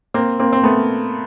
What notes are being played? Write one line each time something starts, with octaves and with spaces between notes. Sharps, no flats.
A#3 C4
A#3 C4
C4
A3 B3